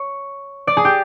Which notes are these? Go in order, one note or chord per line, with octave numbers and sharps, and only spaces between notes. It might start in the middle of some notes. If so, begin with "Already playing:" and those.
Already playing: C#5
D5
G#4
G4